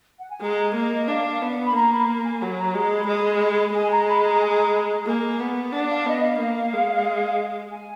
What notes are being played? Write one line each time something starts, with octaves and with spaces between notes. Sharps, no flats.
F#5
G#5
G#3 A#5
A#3 D#5
D4 F5
B3
B5
A#3 A#5
B5
A#5
G#5
F#3 F#5
A#5
G#3 A#5
B5
G#3
G#3 G#5
A#5
B5
A#5
G#5
A#5
B5
A#5
A#3 G#5
B3 F#5
D4 F#5
F5
B3 D#5
F5
A#3
G#3
G#5